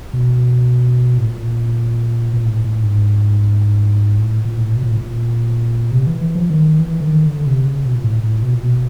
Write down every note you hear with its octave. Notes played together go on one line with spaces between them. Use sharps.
B2
A2
A#2
A#2
A2
A2
G#2
A2
A#2
A2
B2
A#2
A2
A#2
C3
E3
E3
F3
D#3
E3
D3
D#3
D3
C3
C#3
B2
A#2
A2
A2
B2
A#2
B2